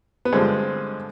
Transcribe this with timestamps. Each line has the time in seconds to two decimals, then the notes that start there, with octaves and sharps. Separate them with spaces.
0.25 B3
0.33 G2 D3 F3 G#3 C4